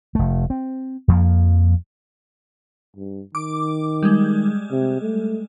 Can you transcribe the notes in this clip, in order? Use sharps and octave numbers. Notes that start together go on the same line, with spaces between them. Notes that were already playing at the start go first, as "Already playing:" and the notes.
F1 A3
C4
F2 F3 A#3
G2
D#3 D6
G3 G#3
C3
A3